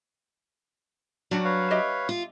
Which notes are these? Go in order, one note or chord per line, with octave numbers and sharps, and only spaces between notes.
F#3 G3 D4 F#4
B4 C#5 F5
G4 D#5 E5
F4